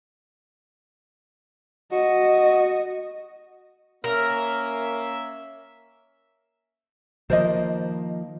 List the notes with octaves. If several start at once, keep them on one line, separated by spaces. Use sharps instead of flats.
F#4 D#5
A#3 C#4 A#4 E5
D#3 F3 A#3 C5 D#5